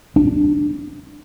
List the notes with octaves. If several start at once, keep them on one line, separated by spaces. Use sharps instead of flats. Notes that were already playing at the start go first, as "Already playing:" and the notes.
D4